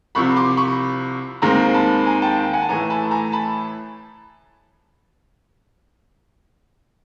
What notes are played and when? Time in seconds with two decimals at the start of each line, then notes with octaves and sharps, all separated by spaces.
0.15 C2 C3 F3 B5 C#6
0.36 C6 D6
0.57 B5 C#6
1.42 D#2 D#3 G#3 C4 A#5 C6
1.74 A5 B5
2.05 G#5 A#5
2.22 G5 A5
2.53 F#5 G#5
2.62 A5
2.69 A2 E3 A3 G#5 A#5
2.90 A5 B5
3.11 G#5 A#5
3.32 A5 B5